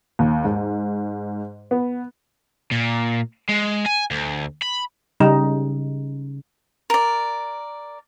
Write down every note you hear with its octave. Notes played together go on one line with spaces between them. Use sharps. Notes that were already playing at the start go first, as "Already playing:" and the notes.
D#2
G#2
B3
A#2
G#3
G#5
D2
B5
C#3 G3 D#4
A#4 D5